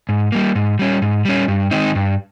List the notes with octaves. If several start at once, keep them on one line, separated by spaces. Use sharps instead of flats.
G#2
G3 A#3
G#2
G3 C#4
G#2
G3 C#4
G2
D#3 G#3 C4 D#4
G2